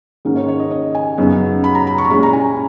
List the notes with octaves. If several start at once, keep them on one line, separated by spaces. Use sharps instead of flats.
G#2 D#3 A#3 C#4
C#5
C#5
D#5
D#5
G#5
F#2 C#3 F#3 B3 D#4
B5
A#5
B5
C#6
A#5
A#2 G#3 C#4 E4 B5
A#5
G#5